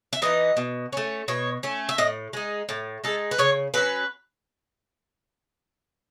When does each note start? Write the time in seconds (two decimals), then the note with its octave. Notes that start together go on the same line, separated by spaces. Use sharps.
0.13 E5
0.22 E3 B3 D#4 D#5
0.57 B2
0.93 A3 C#4
1.28 B2 C#5
1.63 A3 C#4
1.89 E5
1.98 A2 D#5
2.33 G#3 D#4
2.69 A2
3.04 G#3 D#4 A4
3.31 B4
3.38 C#3 C#5
3.74 F#3 C#4 B4